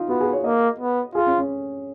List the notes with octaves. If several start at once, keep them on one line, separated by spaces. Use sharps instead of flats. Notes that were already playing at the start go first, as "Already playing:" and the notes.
Already playing: D#4 F4
B3 F#4
G#4
C#5
A#3 D#5
B3
F4 G#4
C#4
C#4